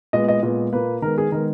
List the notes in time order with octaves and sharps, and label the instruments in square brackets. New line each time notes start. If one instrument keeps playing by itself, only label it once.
[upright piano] A#2 G#3 B3 D#5
D#5
A#2 G#3 B3
A#2 A#3 B4
D#3 G#3 B3 A#4
G#4
D#3 G#3 B3 A#4